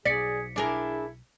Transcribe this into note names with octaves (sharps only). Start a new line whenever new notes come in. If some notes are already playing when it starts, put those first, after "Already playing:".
B1 G#4 D5 B6 C#7
D4 E4 G#4 A#4